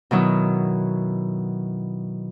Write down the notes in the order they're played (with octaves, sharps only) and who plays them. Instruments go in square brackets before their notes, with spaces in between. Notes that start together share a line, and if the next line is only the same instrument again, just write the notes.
[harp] B2 D#3 F#3 E4